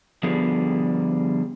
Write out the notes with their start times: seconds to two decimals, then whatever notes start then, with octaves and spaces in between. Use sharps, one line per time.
0.23 D3 F3 G3 B3 G#4